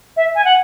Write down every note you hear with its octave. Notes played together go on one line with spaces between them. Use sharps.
E5
G#5
F#5